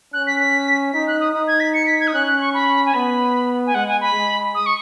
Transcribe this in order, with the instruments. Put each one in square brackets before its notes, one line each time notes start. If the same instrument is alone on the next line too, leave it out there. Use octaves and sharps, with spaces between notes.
[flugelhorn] C#4 [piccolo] F#6
[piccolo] B6
B6
[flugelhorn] D#4 [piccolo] B6
[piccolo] F#6
D#6
[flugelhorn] D#4 [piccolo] D#6
[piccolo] G#6
B6
C#7
B6
G#6
D#6
[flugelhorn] C#4 [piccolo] F#6
[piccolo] F#6
C#6
B5
G#5
[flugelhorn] B3 [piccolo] B5
[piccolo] G#5
[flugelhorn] G#3 [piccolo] F#5
[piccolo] G#5
B5
[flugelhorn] G#3
[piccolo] D#6
C#6